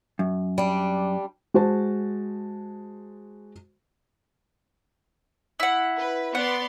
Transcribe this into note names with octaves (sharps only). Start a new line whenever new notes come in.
F#2
G3 D4
G#3 F#4 C5 A5
E4 F#5
B4
B3 D5 F#5 C6